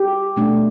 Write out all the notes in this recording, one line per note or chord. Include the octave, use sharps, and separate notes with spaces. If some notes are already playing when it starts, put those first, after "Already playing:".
Already playing: G4
B2 A3 D4